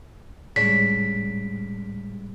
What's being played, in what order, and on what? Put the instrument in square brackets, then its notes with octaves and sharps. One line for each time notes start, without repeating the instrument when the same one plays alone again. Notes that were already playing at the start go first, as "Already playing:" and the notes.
[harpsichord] C#2 D4 C#5 [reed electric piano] A2 G3 [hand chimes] B6